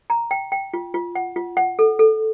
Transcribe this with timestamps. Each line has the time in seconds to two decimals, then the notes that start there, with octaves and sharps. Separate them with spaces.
0.10 A#5
0.31 G5
0.52 G5
0.74 F4
0.94 F4
1.15 F#5
1.36 F4
1.57 F#5
1.79 A4
1.99 A4